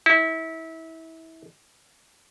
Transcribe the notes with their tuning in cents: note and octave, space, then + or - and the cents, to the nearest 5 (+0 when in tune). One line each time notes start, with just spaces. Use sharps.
E4 -25